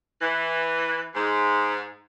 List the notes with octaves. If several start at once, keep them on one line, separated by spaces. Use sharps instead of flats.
E3
G#2